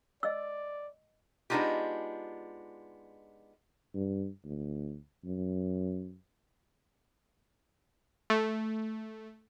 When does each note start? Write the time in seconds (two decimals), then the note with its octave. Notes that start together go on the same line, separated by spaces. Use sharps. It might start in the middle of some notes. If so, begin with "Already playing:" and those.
0.23 D5 D#5 E6
1.50 G#3 B3 D4 D#4 F4 G4
3.94 G2
4.44 D2
5.25 F#2
8.30 A3